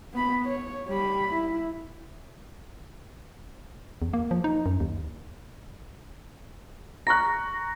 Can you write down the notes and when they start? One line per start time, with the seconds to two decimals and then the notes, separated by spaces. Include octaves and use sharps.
0.13 B3 B5
0.47 C#5
0.88 G3 B5
1.34 E4
4.02 E2
4.13 A#3
4.31 F3
4.44 D#4
4.66 F#2
4.80 D#2
7.07 A#5 C#6 F#6 A#6